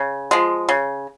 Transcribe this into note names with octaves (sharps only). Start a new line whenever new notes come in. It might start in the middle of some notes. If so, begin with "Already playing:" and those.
Already playing: C#3
F3 G#3
C#3